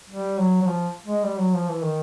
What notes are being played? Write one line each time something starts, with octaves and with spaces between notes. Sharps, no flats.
G3
F#3
F#3
F3
G#3
G3
F#3
F3
E3
D#3